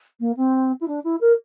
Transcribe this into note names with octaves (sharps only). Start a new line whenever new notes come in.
A#3
C4
E4
D4
E4
A#4